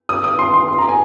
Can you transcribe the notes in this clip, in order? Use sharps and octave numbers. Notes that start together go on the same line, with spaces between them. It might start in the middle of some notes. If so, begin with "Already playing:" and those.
D#6
D#6
C6
C6
C6
A#5
G#5